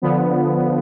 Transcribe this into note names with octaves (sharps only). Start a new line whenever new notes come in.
D3 F3 B3